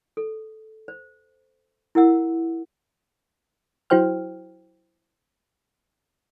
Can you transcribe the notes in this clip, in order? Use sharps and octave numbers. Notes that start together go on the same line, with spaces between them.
A4
C5
E4 A#4 F#5 E6
F#3 E4 F#4 C5 G5 F6